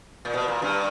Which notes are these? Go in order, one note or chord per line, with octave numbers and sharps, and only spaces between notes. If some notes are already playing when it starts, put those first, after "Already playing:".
A#2
B2
A#2
G2